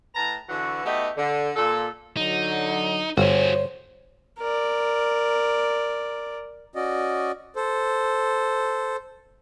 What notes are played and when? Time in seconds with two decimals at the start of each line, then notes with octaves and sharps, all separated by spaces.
0.15 A2 B4 A5 A#5
0.49 D3 E3 F#4
0.85 A3 B3 D#4 F#4 G4
1.17 D3
1.56 A#2 A4
2.17 D3 F#3 D#4
3.17 G1 F#4 G#4 C5 C#5
4.39 A#4 D5
6.75 C#4 F#4 D5 D#5
7.56 A4 C5